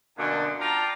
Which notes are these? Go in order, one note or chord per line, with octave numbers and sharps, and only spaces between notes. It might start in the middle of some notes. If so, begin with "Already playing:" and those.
F#2 B2 D3 A#3 D4 G#5
F4 D5 G5 A5 A#5